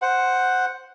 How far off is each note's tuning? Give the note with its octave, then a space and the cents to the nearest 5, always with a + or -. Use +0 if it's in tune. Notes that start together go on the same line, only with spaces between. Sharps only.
C5 +0 F#5 +0